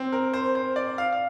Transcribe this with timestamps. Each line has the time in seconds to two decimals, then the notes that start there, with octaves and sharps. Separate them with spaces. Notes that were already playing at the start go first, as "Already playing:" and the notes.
Already playing: C4
0.12 A#4
0.34 C5
0.55 C5
0.76 D5
0.98 F5
1.13 F5